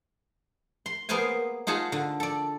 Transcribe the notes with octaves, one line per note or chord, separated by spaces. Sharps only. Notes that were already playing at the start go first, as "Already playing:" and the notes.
C6
A#3 B3 G#4 C5 F5 G#5
D#4 F4 G#4 F#5 A5 A#5
D3
A4 D5